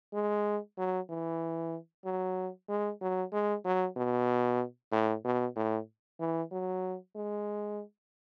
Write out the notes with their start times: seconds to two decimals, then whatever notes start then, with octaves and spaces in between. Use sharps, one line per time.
0.14 G#3
0.78 F#3
1.10 E3
2.05 F#3
2.69 G#3
3.01 F#3
3.32 G#3
3.65 F#3
3.96 B2
4.92 A2
5.25 B2
5.56 A2
6.20 E3
6.52 F#3
7.15 G#3